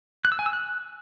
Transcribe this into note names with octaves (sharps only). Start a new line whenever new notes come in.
F#6
E6
G#5
E6
F#6